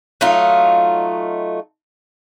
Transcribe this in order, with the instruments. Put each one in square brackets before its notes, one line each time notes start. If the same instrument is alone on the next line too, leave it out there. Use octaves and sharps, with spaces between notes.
[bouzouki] F#3 A3 D#4 F4